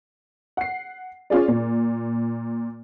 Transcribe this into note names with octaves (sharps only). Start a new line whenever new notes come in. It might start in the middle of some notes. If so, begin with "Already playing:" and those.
F#5 C7
C#4 F4 G#4 D5
A#2